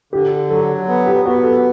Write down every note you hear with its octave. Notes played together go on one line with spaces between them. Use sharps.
D3 G4
F#3 A4
B3
G4
B3 F#4
A4